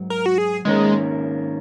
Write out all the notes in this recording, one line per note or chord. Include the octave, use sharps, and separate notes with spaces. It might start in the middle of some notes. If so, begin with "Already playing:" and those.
Already playing: G#2 F#3
A#4
F#4
G#4
G#2 D#3 G#3 A#3 C#4 A#4